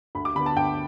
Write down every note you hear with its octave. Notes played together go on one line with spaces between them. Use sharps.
D2 B5
D6
D3 B3 B5
A5
D2 G5